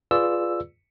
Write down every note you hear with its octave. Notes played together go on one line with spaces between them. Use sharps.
F4 G#4 B4 D5 E6